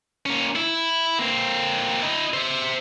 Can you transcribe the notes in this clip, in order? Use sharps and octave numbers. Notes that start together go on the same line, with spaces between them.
A#3 C#4
E4
A#3 C4
E4 D#5
C5 E5